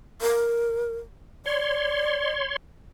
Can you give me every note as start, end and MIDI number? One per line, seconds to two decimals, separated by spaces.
0.22 0.96 70
1.46 2.56 73
1.46 2.35 74
1.46 2.56 84